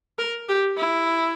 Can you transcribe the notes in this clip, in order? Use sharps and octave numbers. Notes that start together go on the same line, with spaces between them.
A#4
G4
E4